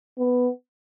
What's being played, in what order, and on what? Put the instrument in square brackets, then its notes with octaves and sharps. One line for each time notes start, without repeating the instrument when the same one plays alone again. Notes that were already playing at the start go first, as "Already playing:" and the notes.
[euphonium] B3